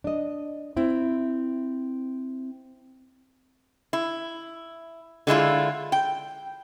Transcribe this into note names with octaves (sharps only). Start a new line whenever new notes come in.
D4 D#5
C4 E4
E4
D3 G#3 E4 F4
G5